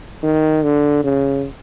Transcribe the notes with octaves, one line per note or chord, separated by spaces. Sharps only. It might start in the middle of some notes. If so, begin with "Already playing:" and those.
D#3
D3
C#3